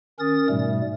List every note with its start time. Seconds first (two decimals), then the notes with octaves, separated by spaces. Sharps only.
0.19 D#3 C#4 A#4 D#6 A6
0.49 G#2 B2 G3 A3